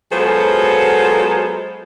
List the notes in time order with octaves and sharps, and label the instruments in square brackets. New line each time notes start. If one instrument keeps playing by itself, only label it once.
[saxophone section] F#3 G#3 B3 F4 A4 C5